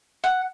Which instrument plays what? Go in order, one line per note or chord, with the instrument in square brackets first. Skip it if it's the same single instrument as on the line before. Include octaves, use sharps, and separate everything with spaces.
[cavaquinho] F#5